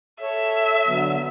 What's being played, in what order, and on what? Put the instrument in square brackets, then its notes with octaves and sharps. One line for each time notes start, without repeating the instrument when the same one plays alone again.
[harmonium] A4 C#5 [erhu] E5
[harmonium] D3 F#3 B3